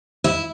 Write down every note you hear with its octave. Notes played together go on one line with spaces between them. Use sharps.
E4